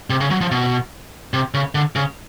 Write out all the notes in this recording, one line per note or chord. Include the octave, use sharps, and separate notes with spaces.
C3
C#3
F#3
F3
B2
C3
C#3
D3
C#3